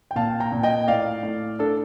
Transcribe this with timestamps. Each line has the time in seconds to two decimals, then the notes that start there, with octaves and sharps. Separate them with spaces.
0.11 G5
0.16 A#2 F5 A5
0.40 G5 A#5
0.52 A#2
0.63 D#5 G5
0.88 A2 D5 F5
1.23 A2
1.59 D4 A4